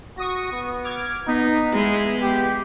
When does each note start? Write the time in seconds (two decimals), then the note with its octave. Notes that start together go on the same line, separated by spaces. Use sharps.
0.17 F#4 C#6 D#6 A#6
0.52 B3
0.83 D6 F6 G#6
1.27 B3 D#4 B6
1.74 G#3 E4
2.22 G4